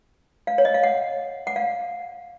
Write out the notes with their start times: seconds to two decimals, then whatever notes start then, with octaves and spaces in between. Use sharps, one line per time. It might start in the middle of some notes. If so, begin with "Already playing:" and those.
0.47 F5
0.58 C#5
0.65 D#5
0.74 F5
0.83 F#5
1.47 F#5
1.56 F5